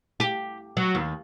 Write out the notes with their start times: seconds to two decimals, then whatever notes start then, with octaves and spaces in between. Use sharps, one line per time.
0.20 G4
0.77 F#3
0.95 D#2